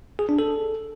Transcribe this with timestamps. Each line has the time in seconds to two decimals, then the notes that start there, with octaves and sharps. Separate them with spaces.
0.19 G#4
0.29 D4
0.39 A4